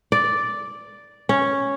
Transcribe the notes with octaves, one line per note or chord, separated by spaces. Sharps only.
D5
C#4